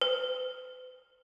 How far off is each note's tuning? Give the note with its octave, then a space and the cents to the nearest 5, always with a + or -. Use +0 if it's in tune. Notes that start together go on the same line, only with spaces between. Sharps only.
B4 +45